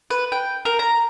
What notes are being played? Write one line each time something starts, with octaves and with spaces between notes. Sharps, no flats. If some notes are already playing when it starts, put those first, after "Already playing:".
B4
G5
A#4
A#5